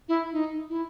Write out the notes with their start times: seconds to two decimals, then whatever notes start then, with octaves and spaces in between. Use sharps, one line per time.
0.09 E4
0.33 D#4
0.70 E4